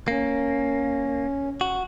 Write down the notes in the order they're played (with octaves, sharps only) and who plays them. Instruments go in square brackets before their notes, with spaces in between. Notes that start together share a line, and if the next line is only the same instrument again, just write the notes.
[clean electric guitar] A#3 [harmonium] C#4
[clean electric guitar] F#4